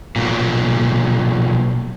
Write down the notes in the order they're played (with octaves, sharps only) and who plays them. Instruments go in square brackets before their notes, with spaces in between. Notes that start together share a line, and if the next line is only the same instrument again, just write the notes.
[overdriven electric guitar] B1 A#2